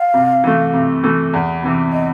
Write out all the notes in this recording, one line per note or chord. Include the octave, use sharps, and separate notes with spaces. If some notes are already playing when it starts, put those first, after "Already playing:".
Already playing: F5
C3
E3 A3
C3
E3 A3
E2
C3 E3
D#5